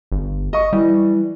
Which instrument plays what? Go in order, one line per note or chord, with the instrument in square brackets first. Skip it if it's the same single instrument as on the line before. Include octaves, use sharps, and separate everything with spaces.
[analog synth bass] G1
[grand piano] D#5 C#6
[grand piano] E3 [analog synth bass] G3